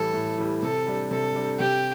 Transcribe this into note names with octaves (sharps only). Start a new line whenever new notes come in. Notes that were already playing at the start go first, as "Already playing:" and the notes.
Already playing: A2 E3 G3 A4
A2
E3 G3
C3 A4
G3 D4
C3 A4
G3 D4
C3 G4